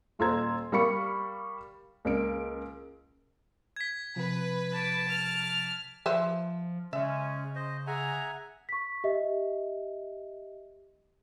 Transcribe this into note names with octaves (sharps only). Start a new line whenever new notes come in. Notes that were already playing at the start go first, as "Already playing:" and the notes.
D#1 F4 A4 C5 A#5 G#6
G3 A#4 F5 B5 C#6 C#7
C#2 A#3 D7
G#6 B6
C3 F3 B4
A5 D6
F6
F3 B4 C5 E5
C#3 G#3 C#4 E5
C5 D#5
G#4 E5 F#5 G#5 A#5
C#6 B6
G4 D#5 E5